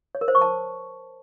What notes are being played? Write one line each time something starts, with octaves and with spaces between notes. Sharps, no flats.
C#5
A#4
C5
C#6
A5